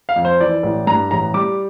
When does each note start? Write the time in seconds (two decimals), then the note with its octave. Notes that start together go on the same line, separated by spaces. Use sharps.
0.09 F5
0.16 F2
0.25 C5
0.40 E3 D5
0.63 A1
0.87 G2 A#5
1.11 A1 A#5
1.34 G3 D6